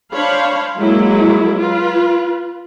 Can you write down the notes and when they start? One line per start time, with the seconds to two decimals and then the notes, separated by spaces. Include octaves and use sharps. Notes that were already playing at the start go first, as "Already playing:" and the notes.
0.13 D4 C5 C#5 F5 B5
0.79 F#3 G#3 A#3 E4
1.58 F4 B4